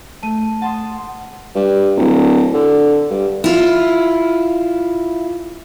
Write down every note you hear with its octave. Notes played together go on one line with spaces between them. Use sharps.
A3 A5 D#7
F#5 A5 C6 D#6
G2
D1
D3
G2
E4 F4